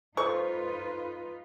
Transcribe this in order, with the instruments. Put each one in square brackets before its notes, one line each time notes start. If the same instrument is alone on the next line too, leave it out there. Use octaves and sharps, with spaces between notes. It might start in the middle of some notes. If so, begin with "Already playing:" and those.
[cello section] D#4 F4 B4 [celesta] A4 [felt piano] C5 [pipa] C#6